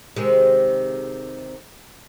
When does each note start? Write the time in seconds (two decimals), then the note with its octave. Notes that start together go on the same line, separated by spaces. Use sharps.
0.16 C3 D#3 G#3